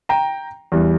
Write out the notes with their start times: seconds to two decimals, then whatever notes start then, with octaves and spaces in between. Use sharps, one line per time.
0.09 G5 A#5
0.72 E2 E3 G3